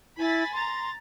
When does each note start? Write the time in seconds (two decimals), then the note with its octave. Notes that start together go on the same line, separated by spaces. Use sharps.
0.18 E4 G#5 B5 A6
0.53 A#5 C6 A6